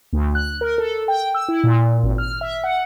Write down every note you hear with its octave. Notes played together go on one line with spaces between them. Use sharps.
D2
F#6
A#4
A4
G5
E6
E4
A#2
G#1
F6
E5
F#5